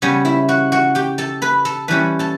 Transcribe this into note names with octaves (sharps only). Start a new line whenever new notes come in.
C#3 G3 B3 C#4 C#5
E4 E5
F#4 F#5
F#4 F#5
G4 G5
A4 A5
B4 B5
A4 A5
E3 G3 C#4 B4 B5
A4 A5